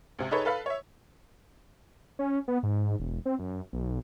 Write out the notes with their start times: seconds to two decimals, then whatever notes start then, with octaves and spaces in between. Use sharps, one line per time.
0.19 C#2 C3
0.31 D#4 G#4 A4 B4 C#5
0.45 A4 B4 F5 B5
0.66 C#5 E5
2.19 C#4
2.48 B3
2.63 G#2
2.99 E1
3.26 C4
3.39 F#2
3.73 B1